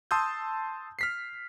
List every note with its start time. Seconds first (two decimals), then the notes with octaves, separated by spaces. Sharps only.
0.11 A5 C6 D#6 E6 G6
0.99 F6 B6 C7